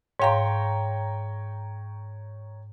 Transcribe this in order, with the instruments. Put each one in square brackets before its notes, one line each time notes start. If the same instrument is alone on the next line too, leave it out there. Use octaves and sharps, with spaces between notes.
[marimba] G#2 F5 C6 [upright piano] C#5 G5 A#5